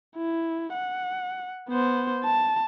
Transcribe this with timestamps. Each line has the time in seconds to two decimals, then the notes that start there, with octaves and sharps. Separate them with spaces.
0.16 E4
0.74 F#5
1.69 B3 C5
2.24 A5